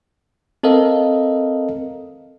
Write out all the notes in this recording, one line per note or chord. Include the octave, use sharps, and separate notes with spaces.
C4 A4 A#4 D#5 F5